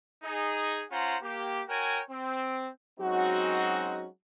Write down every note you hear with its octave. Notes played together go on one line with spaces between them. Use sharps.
D#4 G#4
C#4 F4 C5 F#5 A#5
A#3 G4
F#4 A#4 C#5 G5 G#5
C4
F#3 G#3 C4 C#4 D#4 F#4